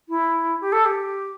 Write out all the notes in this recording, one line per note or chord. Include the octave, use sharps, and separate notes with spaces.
E4
G4
A4
G4